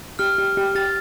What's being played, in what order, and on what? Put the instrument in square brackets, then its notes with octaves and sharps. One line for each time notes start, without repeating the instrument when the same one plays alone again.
[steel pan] G4 [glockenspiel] F6
[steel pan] G4
G4
[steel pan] G4 [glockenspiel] A6